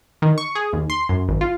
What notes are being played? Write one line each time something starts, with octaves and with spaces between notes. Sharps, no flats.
D#3
C#6
G#4
D#2
C6
F#2
G#1
F4